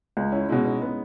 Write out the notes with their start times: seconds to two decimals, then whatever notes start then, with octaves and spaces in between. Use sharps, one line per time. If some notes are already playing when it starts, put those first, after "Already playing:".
0.17 C#2
0.32 C#4 E4
0.49 B2 G#3 C#4 E4
0.65 B3 D#4
0.81 G#3 B3